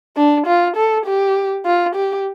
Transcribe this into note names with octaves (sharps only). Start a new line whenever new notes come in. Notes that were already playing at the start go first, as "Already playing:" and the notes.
D4
F4
A4
G4
F4
G4